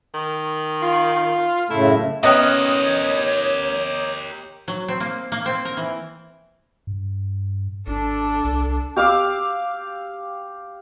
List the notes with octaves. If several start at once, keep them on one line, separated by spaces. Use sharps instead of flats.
D#3
F4
F#2 A2 C#3 A3 E4
B3 C#4 G4 A#4 C#5 D#5 G5 F#6
F#3
C4
A#3
A#3
C4
A#4
E3
G2
G#1 D4 A4
C2
G4 F5 D6 E6